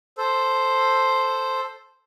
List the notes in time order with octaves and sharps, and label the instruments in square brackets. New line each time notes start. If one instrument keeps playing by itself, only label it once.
[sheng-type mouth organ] A4 C5